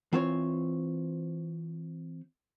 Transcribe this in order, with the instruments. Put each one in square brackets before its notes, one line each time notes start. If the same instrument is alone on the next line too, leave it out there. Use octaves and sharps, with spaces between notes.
[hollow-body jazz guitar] E3 C4 F4 C5 C#5